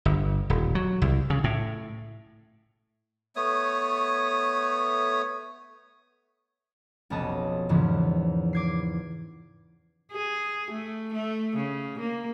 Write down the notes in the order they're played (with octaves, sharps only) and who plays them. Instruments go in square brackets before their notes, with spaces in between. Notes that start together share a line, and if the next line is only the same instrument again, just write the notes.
[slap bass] G1
D#1
F#3
C2
C#3
A2
[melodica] A3 B3 C#5 D#6
[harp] F1 B1 B3 C#4 D#5 A5
E2 G#2 C#3 E3 F3 A#3
D6 G#6 C7
[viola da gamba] G#4
A3
A3
C#3
A#3